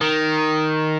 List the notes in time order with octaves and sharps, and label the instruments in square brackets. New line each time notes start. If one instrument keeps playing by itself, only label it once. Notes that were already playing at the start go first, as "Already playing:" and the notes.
[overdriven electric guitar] D#3